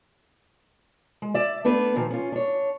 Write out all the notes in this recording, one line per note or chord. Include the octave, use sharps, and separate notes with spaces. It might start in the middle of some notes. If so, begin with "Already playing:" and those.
G#3
D5 E5
A3 B3 D4 B4
A#2 D#3 F3
C#4 F4
D4 C#5